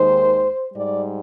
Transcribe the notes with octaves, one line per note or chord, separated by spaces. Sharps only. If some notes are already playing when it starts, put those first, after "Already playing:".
Already playing: D#2 D#3 G#3 C5
G#2 G3 D5